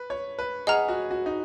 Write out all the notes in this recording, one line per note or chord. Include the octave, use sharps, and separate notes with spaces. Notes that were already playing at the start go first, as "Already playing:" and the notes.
Already playing: B4
C#5
B4
G#4 D#5 F#5 A#5 F6
F#4
F#4
D#4